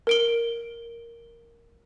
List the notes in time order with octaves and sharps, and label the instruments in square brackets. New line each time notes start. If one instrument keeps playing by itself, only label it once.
[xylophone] A#4 D7 G7